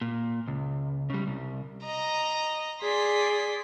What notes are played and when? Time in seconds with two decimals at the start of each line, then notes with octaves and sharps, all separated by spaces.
0.01 A#2
0.47 C#2
1.10 C#3 G3
1.27 C2
1.85 D#5 A#5
2.82 G#4 D5 C6 B6